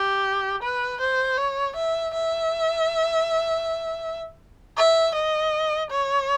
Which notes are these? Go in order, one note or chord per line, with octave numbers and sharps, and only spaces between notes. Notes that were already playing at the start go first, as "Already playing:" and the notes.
Already playing: G4
B4
C5
C#5
E5
E5
E5
D#5
C#5